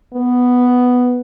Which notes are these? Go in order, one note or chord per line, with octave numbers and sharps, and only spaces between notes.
B3